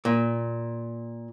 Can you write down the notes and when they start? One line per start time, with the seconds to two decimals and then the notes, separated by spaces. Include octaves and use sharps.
0.05 A#2